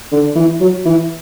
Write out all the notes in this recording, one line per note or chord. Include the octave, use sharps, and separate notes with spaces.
D3
E3
F#3
E3